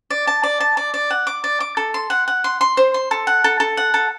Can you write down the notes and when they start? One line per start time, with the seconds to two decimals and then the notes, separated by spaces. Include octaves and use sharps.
0.10 D5
0.27 A5
0.43 D5
0.60 A5
0.77 D5
0.94 D5
1.10 F#5
1.27 D6
1.44 D5
1.60 D6
1.77 A4
1.94 C6
2.10 F#5
2.28 F#5
2.44 C6
2.61 C6
2.77 C5
2.94 C6
3.11 A4
3.27 F#5
3.44 A4
3.60 A4
3.77 F#5
3.94 A4